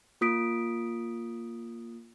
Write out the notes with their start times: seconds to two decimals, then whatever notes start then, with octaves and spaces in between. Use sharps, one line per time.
0.21 A#3 F4 D#6 B6 D7